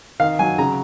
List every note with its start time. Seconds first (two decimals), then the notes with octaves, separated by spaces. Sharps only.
0.20 D#3 F5
0.39 F#3 G#5
0.58 C#3 A#5